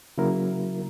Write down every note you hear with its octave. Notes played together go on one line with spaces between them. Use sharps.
C#3 F#3 A#3 E4 A#4